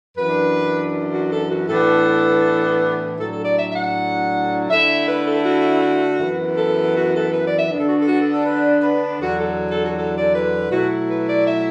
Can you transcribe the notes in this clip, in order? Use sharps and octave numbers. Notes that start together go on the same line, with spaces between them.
F#2 E3 D4 B4
F#4
A4
F#4
A2 E3 B3 D4 A4
A2 F#3 D4 A4
A4
D5
E5
E5
F#5
D3 A3 E4 E5
B4
A4
F#4
F#2 E3 B3
A4
F#4
A4
B4
D5
E5
D3 B3 D4
A4
F#4
A4
F#4
A4
A4
B4
B4
E2 D3 F#3 F#4
A4
A4
F#4
A4
D5
B4
B2 F#3 A3 E4 F#4
B4
D5
E5